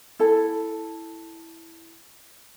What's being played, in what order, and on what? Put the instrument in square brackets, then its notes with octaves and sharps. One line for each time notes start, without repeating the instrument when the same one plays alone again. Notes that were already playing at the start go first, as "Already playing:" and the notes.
[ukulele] E4 A4